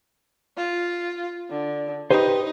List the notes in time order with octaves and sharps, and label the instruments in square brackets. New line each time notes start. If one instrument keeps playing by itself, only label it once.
[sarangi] F4
D3
[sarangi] D#4 [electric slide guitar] G4 B4 C5